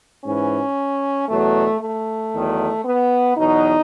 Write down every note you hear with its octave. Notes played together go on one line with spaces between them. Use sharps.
G#2 E3 C#4
E2 B2 F#3 A3
A3
E2 D#3 F#3
B3
E2 B2 F#3 D#4